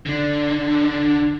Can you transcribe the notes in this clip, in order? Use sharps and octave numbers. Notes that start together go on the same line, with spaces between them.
D3 D4